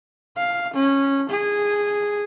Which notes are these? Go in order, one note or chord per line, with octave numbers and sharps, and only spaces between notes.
F5
C#4
G#4